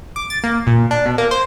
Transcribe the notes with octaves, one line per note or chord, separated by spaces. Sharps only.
D6
A6
A#3
A#2
D4
B2
A#3
C5